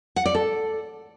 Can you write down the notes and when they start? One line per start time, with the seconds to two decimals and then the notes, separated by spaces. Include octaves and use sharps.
0.16 F#5
0.26 D5
0.35 A4